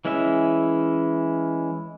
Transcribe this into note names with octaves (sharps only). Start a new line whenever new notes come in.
E3 G#3 C#4 E4 E5